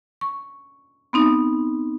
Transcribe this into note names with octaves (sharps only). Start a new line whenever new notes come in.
C#6
B3 C4 D#4